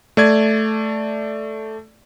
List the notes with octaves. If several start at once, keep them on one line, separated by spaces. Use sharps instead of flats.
A3 D5 G#6